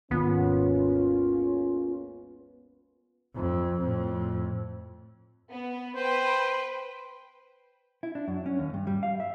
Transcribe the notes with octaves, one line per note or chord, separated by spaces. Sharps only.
G#1 D#2 G#3 A#3 B3 C#4 F4
F2
F2 A2
B3
B4 C5 G5
E4
D4
F#2
C#4
D#2
G2
G3
F5
E5